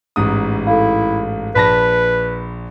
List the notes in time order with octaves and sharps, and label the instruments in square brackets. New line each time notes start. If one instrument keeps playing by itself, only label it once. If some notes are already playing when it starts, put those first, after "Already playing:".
[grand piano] A1 G#2 D#6
[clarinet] E4 [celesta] A4 F5
[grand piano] A#1 A5 A#6 [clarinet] B4 [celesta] B5 B6